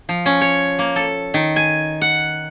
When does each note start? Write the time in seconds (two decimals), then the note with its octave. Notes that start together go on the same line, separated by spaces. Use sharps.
0.09 F3
0.26 C#4
0.41 C#5
0.79 A#3
0.96 A4
1.34 D#3
1.56 G#5
2.01 F#5